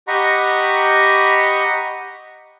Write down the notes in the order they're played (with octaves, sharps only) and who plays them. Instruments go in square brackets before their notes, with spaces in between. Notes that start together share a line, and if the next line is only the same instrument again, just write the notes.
[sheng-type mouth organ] G4 D#5 F#5 A#5 B5 C#6